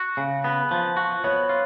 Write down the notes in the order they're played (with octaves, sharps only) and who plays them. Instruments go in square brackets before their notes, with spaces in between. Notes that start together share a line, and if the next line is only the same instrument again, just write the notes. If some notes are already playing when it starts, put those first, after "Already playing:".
Already playing: [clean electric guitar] F#4
C#3
B3
F3
F#4
[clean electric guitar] B3 [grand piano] C#5
[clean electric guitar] F4